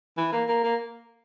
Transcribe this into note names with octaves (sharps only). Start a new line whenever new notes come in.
E3
A#3
A#3
A#3